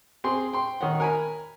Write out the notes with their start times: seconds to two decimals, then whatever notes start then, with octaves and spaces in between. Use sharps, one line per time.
0.24 C4 G#4 C6
0.53 G5 C6
0.81 D#3 C#5 F#5
1.00 A#4 G#5 B5